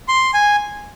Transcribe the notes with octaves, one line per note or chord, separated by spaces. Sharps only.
C6
G#5